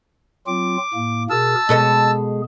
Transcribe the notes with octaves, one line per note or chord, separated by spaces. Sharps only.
F#3 C4 F4 D6
A2 A#3
B2 G#4 A#4 A5 E6
B2 G#3 G#4 A4 D#5